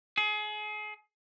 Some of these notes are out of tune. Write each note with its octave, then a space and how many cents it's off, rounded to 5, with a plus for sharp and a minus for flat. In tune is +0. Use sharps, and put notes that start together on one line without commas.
G#4 +30